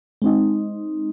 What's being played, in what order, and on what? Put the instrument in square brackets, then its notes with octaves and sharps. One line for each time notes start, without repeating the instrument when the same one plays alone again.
[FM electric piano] G#3 C4 D#4